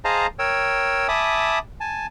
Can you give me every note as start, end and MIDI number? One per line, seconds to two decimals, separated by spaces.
0.05 0.27 68
0.05 0.27 72
0.05 0.27 75
0.05 0.27 77
0.05 0.27 81
0.05 0.27 82
0.39 1.07 70
0.39 1.07 73
0.39 1.07 79
0.39 1.07 88
1.08 1.59 76
1.08 1.59 80
1.08 1.59 81
1.08 1.59 83
1.08 1.59 86
1.08 1.59 87
1.80 2.06 80
1.80 2.06 81